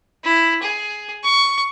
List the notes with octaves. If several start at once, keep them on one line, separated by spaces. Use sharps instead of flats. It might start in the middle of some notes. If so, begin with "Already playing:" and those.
E4
G#4
C#6